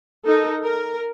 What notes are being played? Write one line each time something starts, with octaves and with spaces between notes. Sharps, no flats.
D#4 A4 A#4
A#4